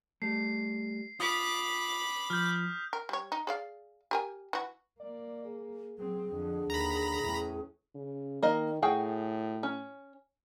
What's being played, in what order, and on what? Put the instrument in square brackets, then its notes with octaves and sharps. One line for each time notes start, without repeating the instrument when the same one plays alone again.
[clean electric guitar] G3 A3 [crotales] C7
[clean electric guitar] F4 [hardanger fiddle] B5 D6 [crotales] D#6 B6
[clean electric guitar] F3 [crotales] F6 G6
[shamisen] A#4
G3 C#5
D#4
G#4 D5 F5
G4 A#4 G#5
E3 F#4
[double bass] A#3 [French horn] D5
[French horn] G#4
[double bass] F#3 C4 [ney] G#4
[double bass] F2 [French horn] D3
[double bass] D#2 [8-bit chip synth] A#5 B5
[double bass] E2 C#4 [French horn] A2
[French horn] C#3
[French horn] D#3 [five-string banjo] A#3 D#5
[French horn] A2 [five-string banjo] F#4 G#4 G5
[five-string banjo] C#4